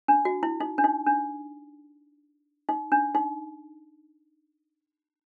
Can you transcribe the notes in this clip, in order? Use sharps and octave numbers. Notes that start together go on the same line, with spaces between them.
D4
F#4
E4
D#4
D4
D#4
D4
D#4
D4
D#4